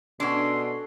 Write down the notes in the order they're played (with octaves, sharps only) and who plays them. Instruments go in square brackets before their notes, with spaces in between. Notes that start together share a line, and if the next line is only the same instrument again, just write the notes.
[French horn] B2 [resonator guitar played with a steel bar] C#4 D4 [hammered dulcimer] F#4 A4 [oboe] C6